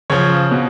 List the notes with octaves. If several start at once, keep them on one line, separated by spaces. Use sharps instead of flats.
C#3 F3 C#5
B2